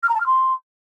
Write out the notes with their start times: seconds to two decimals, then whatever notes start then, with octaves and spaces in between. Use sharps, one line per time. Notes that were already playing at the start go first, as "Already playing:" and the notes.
0.03 F6
0.09 A#5
0.14 A5
0.20 F6
0.26 C6